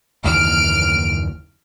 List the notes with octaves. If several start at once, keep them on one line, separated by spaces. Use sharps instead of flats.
F#1 D#2 E3 F6 D7